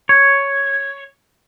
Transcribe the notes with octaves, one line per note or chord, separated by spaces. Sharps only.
C#5